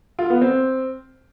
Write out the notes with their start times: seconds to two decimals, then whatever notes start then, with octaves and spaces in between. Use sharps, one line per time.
0.19 F4
0.30 B3
0.41 C4